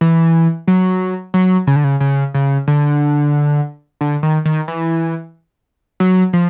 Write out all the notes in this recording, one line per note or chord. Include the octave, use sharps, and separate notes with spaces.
E3
F#3
F#3
C#3
D3
C#3
C#3
C#3
D3
D3
D#3
D#3
E3
F#3
F3